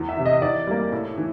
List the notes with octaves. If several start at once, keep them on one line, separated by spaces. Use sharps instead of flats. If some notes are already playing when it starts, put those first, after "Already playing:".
Already playing: E2
E5
C3 E3
D#5
E3 D5
G3 A#3
A2
E3